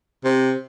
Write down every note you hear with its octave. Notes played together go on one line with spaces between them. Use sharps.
C3